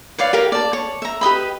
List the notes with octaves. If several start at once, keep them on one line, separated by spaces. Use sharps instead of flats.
B4 C#5 D5 F5
G4 A#4 F5
D5 A5
C#5
E5 A#5
G4 B4 D#5 B5